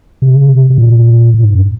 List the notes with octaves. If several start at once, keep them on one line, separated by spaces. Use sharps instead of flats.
C3
C#3
C3
C3
A#2
A#2
G#2
F#2